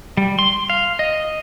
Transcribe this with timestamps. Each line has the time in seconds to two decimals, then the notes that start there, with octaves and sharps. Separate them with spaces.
0.17 G3
0.39 C6
0.70 F5
0.99 D#5